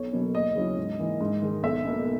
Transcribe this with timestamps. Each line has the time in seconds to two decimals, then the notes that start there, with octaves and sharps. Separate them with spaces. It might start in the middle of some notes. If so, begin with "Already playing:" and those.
Already playing: B1 C#5
0.13 B2 F#3 A#3
0.35 D#2 D#5
0.55 C#3 F#3 C#4 E4
0.77 G#2
0.99 E3 A#3 D#4
1.21 G#2
1.42 D#3 G#3 D#4
1.63 B1 E5
1.85 B2 A#3